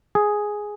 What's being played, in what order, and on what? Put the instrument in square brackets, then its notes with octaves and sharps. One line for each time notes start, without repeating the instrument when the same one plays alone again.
[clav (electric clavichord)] G#4